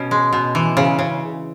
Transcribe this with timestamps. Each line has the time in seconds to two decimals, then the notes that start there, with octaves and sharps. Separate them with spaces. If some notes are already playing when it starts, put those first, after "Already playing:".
Already playing: B2 C#4
0.11 G#3
0.33 B2
0.55 E3
0.77 C#3
0.99 C#3